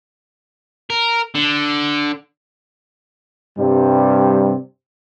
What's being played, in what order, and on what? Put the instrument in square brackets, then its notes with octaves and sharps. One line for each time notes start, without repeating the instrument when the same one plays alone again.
[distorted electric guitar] A#4
D3
[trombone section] G2 C3 G3